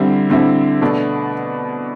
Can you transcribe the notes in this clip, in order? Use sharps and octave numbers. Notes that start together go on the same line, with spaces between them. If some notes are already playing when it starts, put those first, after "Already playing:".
Already playing: D3 G3 C4 E4
D3 G3 C4 E4
B2 A3 D4